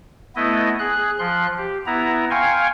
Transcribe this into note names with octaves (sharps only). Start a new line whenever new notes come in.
A3 B3 E4 D#5
G#4 F#6
F3 C6 F#6
G4
B3 E4 A#5
F5 G5 G#5 C6 C#6